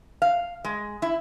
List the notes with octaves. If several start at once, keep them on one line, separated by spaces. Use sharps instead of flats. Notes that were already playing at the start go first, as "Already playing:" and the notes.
F5
G#3
E4